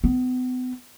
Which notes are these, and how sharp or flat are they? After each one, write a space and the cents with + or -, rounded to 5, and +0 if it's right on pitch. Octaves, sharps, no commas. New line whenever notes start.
B3 +40